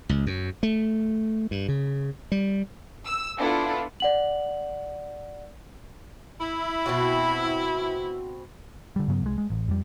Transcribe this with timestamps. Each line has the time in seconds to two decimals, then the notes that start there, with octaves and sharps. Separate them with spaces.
0.09 C#2
0.27 F#2
0.63 A3
1.51 G2
1.68 C#3
2.32 G3
3.06 E6
3.38 B3 D4 E4 F4 A4
4.00 D5 F#5 F#7
6.39 E4
6.86 B2 C4 F#4
8.96 D3 G3
9.08 G2 C#3 F#3 B3
9.23 C2 G#3
9.38 G#3
9.50 A1
9.68 F2 G3